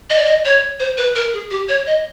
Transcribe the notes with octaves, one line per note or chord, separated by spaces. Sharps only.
D#5
D5
D#5
C#5
C5
B4
A#4
G#4
G4
C#5
D#5